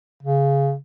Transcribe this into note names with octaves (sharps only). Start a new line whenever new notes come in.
C#3